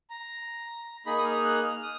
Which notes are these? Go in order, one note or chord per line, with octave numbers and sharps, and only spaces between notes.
A#5
A#3 D#4 G#4 B5
D#6
F6
F#6
F6
D#6